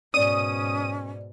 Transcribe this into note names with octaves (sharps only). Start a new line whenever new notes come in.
G#2 B2 C#4 D5 D#6 D#7